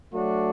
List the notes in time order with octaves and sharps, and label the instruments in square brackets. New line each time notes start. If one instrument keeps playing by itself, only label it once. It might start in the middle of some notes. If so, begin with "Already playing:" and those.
[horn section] F#3 A3 D4 F#4